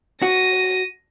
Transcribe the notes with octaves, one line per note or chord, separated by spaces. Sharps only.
F#4 A#6 D#7